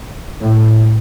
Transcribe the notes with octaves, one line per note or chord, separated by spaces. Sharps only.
A2